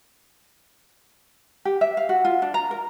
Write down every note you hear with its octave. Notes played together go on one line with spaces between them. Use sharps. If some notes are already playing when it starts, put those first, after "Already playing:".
G4
E5
F5
F#4
F4
D4
A#5
A#4